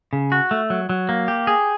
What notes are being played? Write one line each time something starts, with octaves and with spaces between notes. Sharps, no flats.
C#3
F#4
A3
F#3
F#3
A#3
G4
G#4